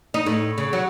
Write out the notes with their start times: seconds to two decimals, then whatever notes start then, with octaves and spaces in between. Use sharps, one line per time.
0.14 D#4
0.26 A2
0.58 C#3
0.73 F#3